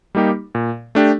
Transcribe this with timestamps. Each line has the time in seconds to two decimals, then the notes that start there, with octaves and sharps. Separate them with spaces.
0.15 G3 A#3 D#4 G4
0.55 A#2
0.95 A3 D4 G4